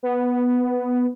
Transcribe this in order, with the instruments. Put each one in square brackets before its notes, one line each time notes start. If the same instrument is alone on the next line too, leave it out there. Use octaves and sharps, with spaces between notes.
[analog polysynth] B3